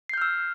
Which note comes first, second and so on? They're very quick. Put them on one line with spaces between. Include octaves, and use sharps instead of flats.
C7 G6 F6 E6